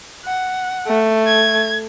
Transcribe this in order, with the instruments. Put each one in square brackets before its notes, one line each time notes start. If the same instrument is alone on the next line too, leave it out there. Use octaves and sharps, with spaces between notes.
[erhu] F#5
[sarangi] A3
[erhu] G#6